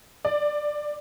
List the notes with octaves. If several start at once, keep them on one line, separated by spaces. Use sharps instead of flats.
D5